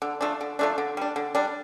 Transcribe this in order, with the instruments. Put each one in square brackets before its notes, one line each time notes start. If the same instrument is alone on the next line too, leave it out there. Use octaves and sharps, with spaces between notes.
[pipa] D3
F3 A3 D4
D3
F3 A3 D4
D3
G3 D4
D3
G3 D4